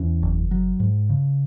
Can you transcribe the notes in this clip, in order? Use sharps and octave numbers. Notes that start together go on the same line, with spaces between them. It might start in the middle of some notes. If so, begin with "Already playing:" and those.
Already playing: E2 C#4
F#1
F#3
G#2
C#3